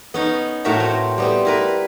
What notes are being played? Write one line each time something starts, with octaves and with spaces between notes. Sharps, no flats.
B3 C#4 D#4
A2 A3 F#4 A#4 E5 A#5
C4
G3 B3 C4
E4 A#4 B4